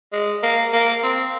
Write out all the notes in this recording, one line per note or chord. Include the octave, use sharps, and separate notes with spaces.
G#3
A#3
A#3
C4